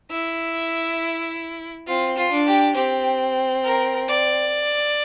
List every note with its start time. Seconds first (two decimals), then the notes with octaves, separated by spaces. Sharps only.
0.11 E4 E5
1.87 C4 F4
2.17 F4
2.32 D4
2.47 G4
2.76 C4 G4
3.64 A#4
4.08 D5